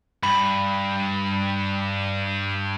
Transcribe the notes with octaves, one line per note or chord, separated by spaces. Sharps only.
G2 B5